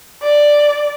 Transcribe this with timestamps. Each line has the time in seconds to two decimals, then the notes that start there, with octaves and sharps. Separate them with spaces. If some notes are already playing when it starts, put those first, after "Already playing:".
0.22 D5